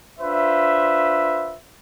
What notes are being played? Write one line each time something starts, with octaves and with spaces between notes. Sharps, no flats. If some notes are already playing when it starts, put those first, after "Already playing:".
D4 F4 B4 C5 E5